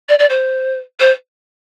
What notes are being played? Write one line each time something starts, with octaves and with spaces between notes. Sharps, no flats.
D5
D5
C5
C5